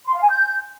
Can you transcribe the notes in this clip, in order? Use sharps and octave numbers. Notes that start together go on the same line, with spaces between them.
C6
F5
G#5
G6